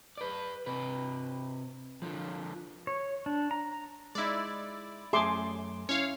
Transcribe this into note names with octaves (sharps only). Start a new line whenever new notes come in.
B4 D5
C3 B4
D3 F3
C#5
D4
A#5
G#3 D#4 E4 D5
F#2 A3 G#4 E5 C6 D6
C#4 E4 C#5 F5